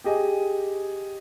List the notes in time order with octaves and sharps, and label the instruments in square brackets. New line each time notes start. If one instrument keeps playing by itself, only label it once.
[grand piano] G4 G#4 D#5 G#5